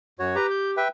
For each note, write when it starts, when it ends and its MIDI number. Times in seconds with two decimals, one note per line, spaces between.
0.19 0.36 42
0.19 0.36 66
0.19 0.36 73
0.36 0.81 67
0.36 0.47 71
0.36 0.47 82
0.51 0.71 91
0.77 0.88 71
0.77 0.88 76
0.77 0.88 79